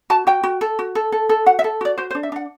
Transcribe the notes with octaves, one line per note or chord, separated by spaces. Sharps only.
F#4 A5
F#4 G5
F#4
A4
F#4
A4
A4
A4
F#4 F#5
E5
A4
F#4 D5
F#4 C5
C5
D4
E5
D4 F#5